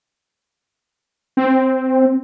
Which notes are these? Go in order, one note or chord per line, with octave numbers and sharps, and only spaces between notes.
C4